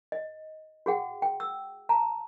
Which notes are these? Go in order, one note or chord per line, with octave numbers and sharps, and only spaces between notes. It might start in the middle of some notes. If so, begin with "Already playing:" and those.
D#5
F#4 G#4 F#5 G5
G5
E6
A5 A#5